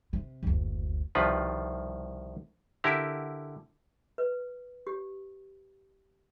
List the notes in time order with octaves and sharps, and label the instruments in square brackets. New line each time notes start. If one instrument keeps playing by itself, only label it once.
[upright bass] C3
F#1 D2
[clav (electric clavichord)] C2 B2 D#3 F3 F4 B4
D3 E4 G4 A#4
[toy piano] B4
G4